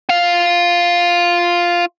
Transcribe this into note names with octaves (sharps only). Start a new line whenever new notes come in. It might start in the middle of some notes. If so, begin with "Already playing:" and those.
F4 F5